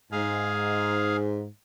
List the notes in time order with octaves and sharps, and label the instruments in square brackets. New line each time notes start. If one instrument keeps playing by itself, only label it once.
[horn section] G#2 [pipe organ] G#4 F5